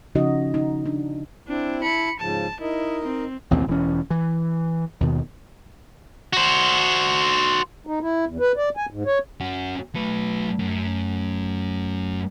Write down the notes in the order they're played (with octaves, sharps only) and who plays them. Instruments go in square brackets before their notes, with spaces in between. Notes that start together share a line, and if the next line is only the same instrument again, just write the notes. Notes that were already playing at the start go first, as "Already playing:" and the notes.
[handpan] C#3 F3 C#4 D#4 F#4 D#5
D#4
D4
[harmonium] C4 E4 [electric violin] D4
[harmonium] E4 A5 [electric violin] B5 C#7
[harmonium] G#2 C#3 F3 [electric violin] A5
[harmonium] D#4 A#4 D#5 [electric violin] E4
[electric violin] C4
[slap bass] A1 D#2 B2 C4
E1 E3 C#4
E3
D#2 B2 D#3
[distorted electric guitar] F#4 C5
[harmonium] D#4
E4
E2
B4
D5
G#5
G#2
C#5
[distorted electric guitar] C#4 F#4
[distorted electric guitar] F#3 B4 [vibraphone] A3
[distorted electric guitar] F#2